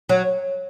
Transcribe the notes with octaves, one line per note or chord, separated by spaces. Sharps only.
F#3